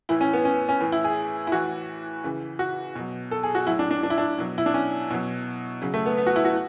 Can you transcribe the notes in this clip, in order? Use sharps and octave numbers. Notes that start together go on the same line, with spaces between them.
A2 E3 E4
C#4
B3
C#4
C#4
A2 E3
E4
G#4
E4
A2 E3 F#4
C#3 E3
F#4
B2 F#3
A4
G#4
F#4
A2 F#3 E4
D4
D4
D4
E4
D4
B2 F#3
E4
D4
C#4
B2 F#3
C#3 F#3
A3
B3
B3
F#4
E4
F#4